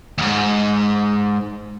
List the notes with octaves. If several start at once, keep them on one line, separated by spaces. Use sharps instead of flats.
D#2 G#2